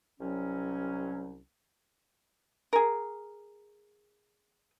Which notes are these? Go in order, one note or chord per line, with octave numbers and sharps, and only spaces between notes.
C2 F#3 C#4
G#4 A#4